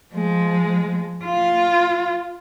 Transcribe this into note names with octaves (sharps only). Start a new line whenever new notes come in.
F3 G#3
F4